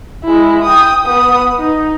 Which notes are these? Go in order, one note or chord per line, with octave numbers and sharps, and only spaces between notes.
G#3 E4
G5 D#6
B3 D#6
D#4